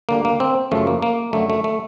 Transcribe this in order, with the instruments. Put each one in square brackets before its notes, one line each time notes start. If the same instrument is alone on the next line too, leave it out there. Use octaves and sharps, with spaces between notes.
[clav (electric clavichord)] D2 D3 G3 A#3
A#3
C4
F#2 C#3 F3 A3
A#3
A#3
F#2 D3 F#3 A3
A3
A3